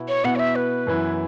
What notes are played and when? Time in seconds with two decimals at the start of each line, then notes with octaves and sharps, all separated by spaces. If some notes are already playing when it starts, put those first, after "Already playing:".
Already playing: B2 B3 E4
0.08 C#5
0.24 B2 B3 E4 F#5
0.35 C#5
0.39 E5
0.55 B4
0.87 F#2 E3 B3 E4